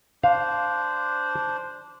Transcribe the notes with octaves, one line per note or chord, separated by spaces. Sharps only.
D4 C5 F5